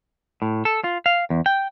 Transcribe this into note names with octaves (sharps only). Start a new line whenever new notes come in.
A2
A4
F4
F5
E2
G5